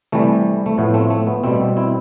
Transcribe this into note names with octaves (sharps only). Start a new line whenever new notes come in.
C3 E3 G3 A3
A3
A2 F3 B3
A3 C4
A3
B3
B2 G3 A3 C4
C4 E4